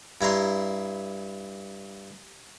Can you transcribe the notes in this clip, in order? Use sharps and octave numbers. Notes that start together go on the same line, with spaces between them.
G2 E4 A#5 C6